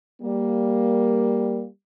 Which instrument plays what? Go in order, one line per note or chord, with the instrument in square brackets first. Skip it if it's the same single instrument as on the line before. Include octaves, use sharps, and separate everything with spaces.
[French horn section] G3 A#3